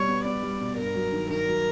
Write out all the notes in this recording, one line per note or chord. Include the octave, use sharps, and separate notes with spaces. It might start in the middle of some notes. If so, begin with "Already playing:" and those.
Already playing: B2 G3 C#5
B3
B3 D5
G3
B2
G2 A#4
F#3
D#3
D#3 A#4
F#3